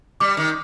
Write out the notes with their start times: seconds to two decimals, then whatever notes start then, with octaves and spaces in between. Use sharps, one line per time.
0.20 G3 D6
0.37 D#3